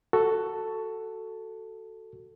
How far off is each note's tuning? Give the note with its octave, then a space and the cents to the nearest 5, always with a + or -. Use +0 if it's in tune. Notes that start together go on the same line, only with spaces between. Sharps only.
F#4 +10 A4 +5